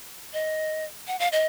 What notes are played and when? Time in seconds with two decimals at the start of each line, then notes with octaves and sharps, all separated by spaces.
0.33 D#5
1.08 F#5
1.20 F5
1.32 D#5